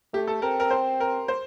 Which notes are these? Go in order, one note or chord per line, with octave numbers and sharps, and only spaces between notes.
A3 G4
A4
C4 A#4
A#4
C5
A#4
C5